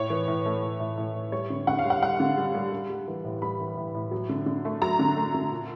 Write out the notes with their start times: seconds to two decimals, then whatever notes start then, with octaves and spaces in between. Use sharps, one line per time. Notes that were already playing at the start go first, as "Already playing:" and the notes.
Already playing: A2 C#5
0.10 E3
0.28 A2
0.46 A3
0.63 A2
0.80 A2
0.97 A2
1.15 A2
1.32 G3 C#5
1.50 D3
1.67 D3 F#5
1.79 F5
1.85 G3
1.90 F#5
2.02 G3 F#5
2.20 D3
2.37 G3
2.55 G3
2.72 G3
2.90 G3
3.07 E3
3.24 A2
3.42 G3 B5
3.60 E3
3.77 A2
3.95 A2
4.11 F#3
4.29 D3
4.46 D3
4.65 A3
4.82 F#3 A#5
4.99 D3
5.17 A3
5.34 D3
5.52 A#2